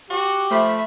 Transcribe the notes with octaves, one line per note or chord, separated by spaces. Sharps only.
F#4 G4
F3 A3 E5 B5